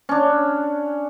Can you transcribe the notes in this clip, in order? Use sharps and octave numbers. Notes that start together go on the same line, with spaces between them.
C#4 D4